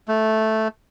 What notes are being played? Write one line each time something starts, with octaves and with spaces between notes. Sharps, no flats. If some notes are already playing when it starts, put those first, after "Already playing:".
A3